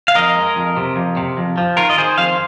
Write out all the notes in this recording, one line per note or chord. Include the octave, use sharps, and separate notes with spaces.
F5
F2 A#4 D#5
G#3
F2
C3
F2
C3
F2
F3
D#3 F4 A#4
D#5
D#3 G#4 C5
F2 C5 F5